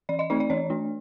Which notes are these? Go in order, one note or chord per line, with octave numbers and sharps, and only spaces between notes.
E3 D5
D#5
A3 C4 D#4 D5
D5
E3 C#5
A3 D4